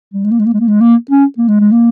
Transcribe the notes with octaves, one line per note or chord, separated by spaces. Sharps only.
G3
G#3
A#3
G#3
A#3
G#3
A#3
G#3
A#3
C#4
A#3
G#3
G#3
A#3